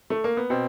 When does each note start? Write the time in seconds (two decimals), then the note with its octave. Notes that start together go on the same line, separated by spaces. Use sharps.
0.10 A3
0.24 A#3
0.37 B3
0.50 B2 C4